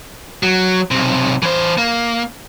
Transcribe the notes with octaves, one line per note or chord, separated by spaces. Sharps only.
F#3
B1 C3
E3 C5
A#3